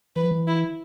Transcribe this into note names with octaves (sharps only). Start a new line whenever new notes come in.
E3 B4
F3
E3
E4